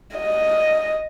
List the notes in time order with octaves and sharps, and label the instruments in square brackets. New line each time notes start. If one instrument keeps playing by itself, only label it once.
[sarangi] D#5